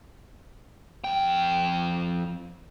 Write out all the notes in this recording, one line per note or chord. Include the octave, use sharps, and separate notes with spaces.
F2 G5